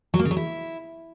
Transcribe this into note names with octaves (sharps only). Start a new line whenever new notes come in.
F#3
A#3
C#3
F#3
E4